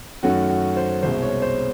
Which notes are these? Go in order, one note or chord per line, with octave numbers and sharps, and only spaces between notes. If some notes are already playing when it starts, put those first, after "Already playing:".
F#2 D#3 F#3 A3 F#4
F#4
C5
C2 B2 G#3 C5
C#5
C5